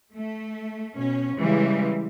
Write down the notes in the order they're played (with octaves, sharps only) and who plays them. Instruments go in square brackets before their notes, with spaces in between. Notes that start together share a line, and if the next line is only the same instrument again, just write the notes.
[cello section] A3
B2 C#4
C#3 E3 G3 G#3